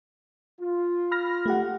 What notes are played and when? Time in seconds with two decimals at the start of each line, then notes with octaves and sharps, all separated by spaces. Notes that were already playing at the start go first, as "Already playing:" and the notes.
0.60 F4
1.11 B5 F6 A#6
1.46 A3 G4 F#5